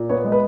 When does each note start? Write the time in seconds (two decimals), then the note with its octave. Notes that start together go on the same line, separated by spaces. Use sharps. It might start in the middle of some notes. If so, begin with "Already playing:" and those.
Already playing: A#2
0.09 B3 C#5
0.24 G#3
0.32 B4